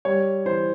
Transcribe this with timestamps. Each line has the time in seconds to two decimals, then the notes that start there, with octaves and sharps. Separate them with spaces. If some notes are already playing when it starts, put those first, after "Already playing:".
0.05 G3 C#5
0.45 E3 C5